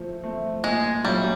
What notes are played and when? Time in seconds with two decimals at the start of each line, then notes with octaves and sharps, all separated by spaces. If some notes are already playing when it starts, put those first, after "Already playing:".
Already playing: F3 A3 C4
0.23 A3 C4
0.64 A#2 G#3
1.04 F#3 G3 A3 C#4 F4